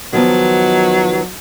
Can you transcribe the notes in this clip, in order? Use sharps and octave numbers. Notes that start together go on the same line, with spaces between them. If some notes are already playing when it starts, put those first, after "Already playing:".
D#3 F3 F#3 B3